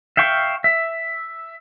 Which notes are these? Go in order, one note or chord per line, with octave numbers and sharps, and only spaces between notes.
E5 F5 G5 C#6
E5